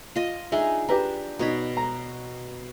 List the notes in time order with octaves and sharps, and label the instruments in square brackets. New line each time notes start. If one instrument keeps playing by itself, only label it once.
[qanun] F4 D#5
[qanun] D4 D#4 G#4 [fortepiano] E5
[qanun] D4 [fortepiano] G4 B4 A#5
[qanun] B2 C#5 B5 [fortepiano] D#4
[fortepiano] A#5